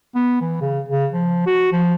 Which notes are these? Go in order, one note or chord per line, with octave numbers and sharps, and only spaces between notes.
B3
E3
C#3
C#3
F3
F#4
F3